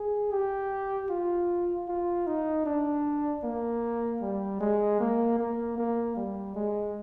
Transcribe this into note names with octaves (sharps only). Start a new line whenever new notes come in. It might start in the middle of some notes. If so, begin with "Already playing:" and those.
Already playing: G#4
G4
F4
F4
D#4
D4
A#3
G3
G#3
A#3
A#3
A#3
G3
G#3